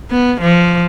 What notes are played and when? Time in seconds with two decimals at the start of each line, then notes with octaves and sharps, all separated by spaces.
0.11 B3
0.41 F3